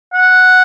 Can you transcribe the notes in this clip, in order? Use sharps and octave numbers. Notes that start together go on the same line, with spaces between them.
F#5